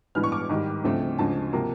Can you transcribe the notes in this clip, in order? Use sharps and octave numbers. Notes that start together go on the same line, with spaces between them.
A1 G2 E3 G#3 B3 F6
C#6
D6
G#2 D#3 G3
D2 C#3 F3 A3 C4
D2 C#3 F3 G#3 A5
C3 F3 A#3